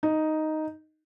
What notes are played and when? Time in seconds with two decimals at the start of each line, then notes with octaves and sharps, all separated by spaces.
0.03 D#4